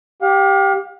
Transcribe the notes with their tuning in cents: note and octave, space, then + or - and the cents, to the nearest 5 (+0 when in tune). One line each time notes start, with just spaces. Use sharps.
G4 +0 F5 +40